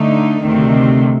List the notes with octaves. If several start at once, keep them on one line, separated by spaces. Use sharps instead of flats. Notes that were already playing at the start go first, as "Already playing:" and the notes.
Already playing: D3 A3 D#4
D2 C3 D#3 A3 C4